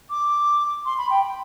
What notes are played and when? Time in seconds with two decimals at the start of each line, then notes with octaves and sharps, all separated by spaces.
0.10 D6
0.85 C6
0.98 B5
1.10 G5